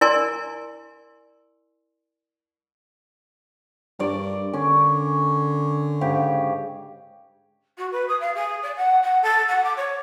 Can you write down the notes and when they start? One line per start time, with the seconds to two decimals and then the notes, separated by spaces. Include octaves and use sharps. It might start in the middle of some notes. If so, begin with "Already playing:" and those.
0.01 E4 A#4 D5 G#5 C6
3.99 G2 A#4 D5
4.53 D3 C#4
6.01 G#2 C#3 G4
7.78 F#4
7.92 B4
8.08 D#6
8.21 F5
8.35 G#4
8.63 D5
8.76 F#5
9.03 F#5
9.23 A4
9.49 F#5
9.64 D6
9.77 C#5